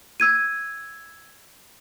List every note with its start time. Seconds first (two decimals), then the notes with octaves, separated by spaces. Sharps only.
0.20 E6 G#6 D#7